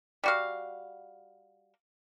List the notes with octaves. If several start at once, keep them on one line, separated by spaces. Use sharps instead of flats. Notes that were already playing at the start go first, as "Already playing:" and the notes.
G3 F#4 F5